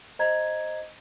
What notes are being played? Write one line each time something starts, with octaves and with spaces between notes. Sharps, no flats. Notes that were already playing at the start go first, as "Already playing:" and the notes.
C5 D#5 A#5 G#6